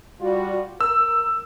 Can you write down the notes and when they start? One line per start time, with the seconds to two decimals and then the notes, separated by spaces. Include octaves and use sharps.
0.20 G3 F4 F#4
0.81 A#4 E6